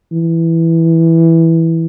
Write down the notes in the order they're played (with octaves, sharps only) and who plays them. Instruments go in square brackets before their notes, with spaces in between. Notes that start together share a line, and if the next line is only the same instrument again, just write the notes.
[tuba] E3